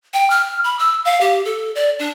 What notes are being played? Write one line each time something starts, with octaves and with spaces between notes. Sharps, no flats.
G5
F6
B5
E6
F5
G4
A4
D5
D4